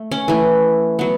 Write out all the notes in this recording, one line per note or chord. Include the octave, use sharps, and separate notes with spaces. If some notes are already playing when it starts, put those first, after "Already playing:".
Already playing: A3
C#4
E3 A3
F#3 B3